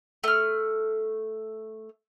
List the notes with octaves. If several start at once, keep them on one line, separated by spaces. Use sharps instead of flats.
A3 F6